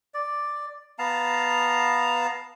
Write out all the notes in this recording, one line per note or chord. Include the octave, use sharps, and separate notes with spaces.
D5
B3 F5 A5 A#5